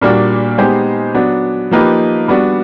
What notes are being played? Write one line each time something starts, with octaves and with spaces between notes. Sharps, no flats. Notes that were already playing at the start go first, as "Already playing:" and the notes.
A#2 G3 A#3 D4 F#4
G#3 B3 D#4 G4 C5
F#3 B3 D4
F3 A#3 D#4 G4 B4
G3 B3 D4 F#4